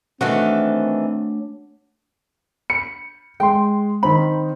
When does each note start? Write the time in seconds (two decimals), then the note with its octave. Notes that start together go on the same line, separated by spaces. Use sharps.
0.21 D#3 E3 A3 C4 D4 F#4 A4 C#5
2.70 B5 C#7
3.40 G#3 G5 C6
4.03 D#3 C4 B5